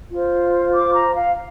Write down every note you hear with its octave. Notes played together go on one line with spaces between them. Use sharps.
F4 C5
D6
A#5
F5